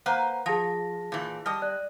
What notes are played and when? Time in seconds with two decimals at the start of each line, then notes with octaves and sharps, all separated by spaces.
0.06 A#3 B4 C5 F#5 A#5
0.46 F3 G#4 A5 A#6
1.12 A#2 E3
1.46 G3 D#5 A5 D#6 F6
1.62 D5 F#6